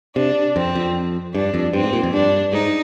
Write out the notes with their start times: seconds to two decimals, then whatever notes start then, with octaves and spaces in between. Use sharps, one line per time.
0.16 C3 D4
0.56 F2 C4
0.75 F2
1.34 G2 D4
1.54 F2
1.73 G2 C4
1.83 G#2
1.93 A#2
2.03 F2
2.12 G2 D4
2.52 G#2 D#4